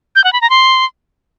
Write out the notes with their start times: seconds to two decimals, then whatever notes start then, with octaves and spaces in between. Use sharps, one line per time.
0.16 G6
0.24 F#5
0.33 B5
0.41 A#5
0.50 C6